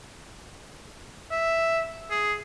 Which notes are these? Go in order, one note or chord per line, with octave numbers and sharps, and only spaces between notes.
E5
G#4